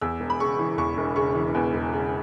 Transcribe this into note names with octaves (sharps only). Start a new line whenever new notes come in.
E2 E6
E1
B5
C#3 C#6
E3
E2 C#6
E1
C#3 C#6
E3
E2 B4
E1
C#3